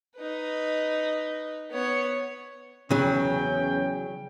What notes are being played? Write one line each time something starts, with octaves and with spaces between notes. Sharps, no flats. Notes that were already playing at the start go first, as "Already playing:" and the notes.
D#4 B4
B3 C#5
E2 C#3 F#3 C#4 G5